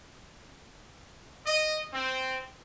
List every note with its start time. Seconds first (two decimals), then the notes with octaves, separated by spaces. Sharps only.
1.46 D#5
1.93 C4